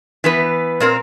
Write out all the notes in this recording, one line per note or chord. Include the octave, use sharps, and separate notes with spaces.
E3 B3 B4
A#2 C4 A#4